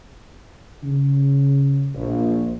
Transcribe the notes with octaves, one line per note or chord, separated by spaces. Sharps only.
C#3
A#1